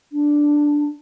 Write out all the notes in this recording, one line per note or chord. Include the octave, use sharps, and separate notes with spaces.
D4